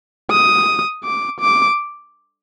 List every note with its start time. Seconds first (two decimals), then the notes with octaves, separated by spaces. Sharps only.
0.31 D#6
1.04 D6
1.40 D6